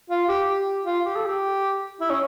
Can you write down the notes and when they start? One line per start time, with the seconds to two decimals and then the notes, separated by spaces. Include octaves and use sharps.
0.10 F4
0.28 G4
0.48 G4
0.85 F4
1.05 G4
1.16 A4
1.26 G4
2.01 E4
2.11 C#4